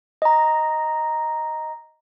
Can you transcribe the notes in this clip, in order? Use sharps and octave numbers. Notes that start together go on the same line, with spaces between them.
D#5 A#5